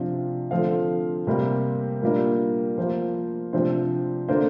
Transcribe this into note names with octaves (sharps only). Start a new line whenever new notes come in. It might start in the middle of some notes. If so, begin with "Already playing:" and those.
Already playing: C3 F3 D4 F4
D3 F3 C4 F5
C3 G3 A#3
A#2 G3 A#3 D4
F3 A#3 F4 C5
C3 F3 D4 C5
D3 A#3 D4 C5